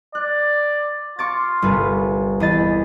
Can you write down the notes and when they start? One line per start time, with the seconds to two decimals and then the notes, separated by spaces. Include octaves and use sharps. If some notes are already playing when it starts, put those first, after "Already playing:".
0.15 D5 F#6
1.19 F4 C#6 D6 A6
1.62 G1 C2 B4
2.40 E2 D#5 B5 A6